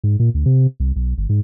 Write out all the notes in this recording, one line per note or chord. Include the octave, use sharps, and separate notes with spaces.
G#2
A#2
D2
C3
C2
B1
G1
G#2